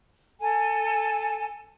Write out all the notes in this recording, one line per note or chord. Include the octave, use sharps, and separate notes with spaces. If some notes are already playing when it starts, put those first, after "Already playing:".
A4 G#5